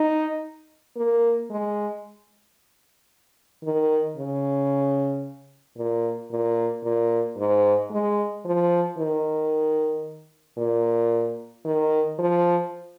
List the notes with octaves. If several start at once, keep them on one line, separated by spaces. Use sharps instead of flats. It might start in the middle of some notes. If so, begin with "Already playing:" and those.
Already playing: D#4
A#3
G#3
D#3
C#3
A#2
A#2
A#2
G#2
G#3
F3
D#3
A#2
D#3
F3